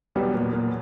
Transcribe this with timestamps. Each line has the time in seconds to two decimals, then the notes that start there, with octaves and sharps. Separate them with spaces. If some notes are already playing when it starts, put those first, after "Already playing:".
0.15 E2 B2 F#3 G3 B3
0.34 A#2
0.53 A#2